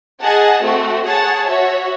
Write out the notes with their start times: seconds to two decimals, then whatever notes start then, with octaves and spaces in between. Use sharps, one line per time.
0.21 G#4 D#5 F#5 A5
0.63 A3 C4 F#4
1.05 G#4 C#5 F#5 A5
1.47 F#4 C#5 E5